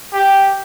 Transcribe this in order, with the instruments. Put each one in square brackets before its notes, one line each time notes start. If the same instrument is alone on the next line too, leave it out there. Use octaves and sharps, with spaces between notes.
[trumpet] G4